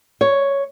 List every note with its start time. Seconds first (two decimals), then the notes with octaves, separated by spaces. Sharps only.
0.21 C#5